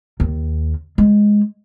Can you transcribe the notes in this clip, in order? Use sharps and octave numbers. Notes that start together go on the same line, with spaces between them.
D#2
G#3